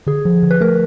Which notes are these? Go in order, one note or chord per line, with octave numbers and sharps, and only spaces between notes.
D3 G#4
F3
D3
B4
A3 A#4